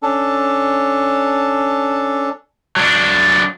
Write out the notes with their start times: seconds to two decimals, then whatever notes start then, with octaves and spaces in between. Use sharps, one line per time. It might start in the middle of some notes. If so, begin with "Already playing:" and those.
0.03 C#4 D4 A4
2.76 F#3 D4